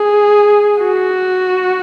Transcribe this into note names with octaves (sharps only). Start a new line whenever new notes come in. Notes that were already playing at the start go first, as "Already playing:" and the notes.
Already playing: G#4
F#4